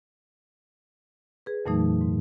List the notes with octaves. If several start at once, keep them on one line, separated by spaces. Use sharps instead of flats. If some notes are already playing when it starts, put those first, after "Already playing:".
G#4 B4
F2 A#2 E3 F#3 A3 D#4
G#2